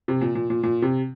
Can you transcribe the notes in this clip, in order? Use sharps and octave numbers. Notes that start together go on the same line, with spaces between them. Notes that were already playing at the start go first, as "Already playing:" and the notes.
C3
A#2
A#2
A#2
A#2
C3